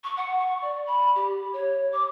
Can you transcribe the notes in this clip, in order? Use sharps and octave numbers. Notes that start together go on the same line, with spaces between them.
C#6
F#5
C#6
D5
B5
G4
C#5
D6